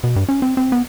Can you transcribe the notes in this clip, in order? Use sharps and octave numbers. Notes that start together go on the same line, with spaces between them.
B2
G2
C#4
C4
C4
B3